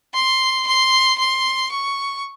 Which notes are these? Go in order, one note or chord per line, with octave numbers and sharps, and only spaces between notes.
C6
C6
C6
C#6